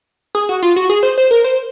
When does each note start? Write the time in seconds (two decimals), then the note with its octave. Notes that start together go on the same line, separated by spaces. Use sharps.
0.35 G#4
0.49 F#4
0.62 F4
0.76 F#4
0.89 G#4
1.03 C5
1.18 C5
1.31 A#4
1.44 C5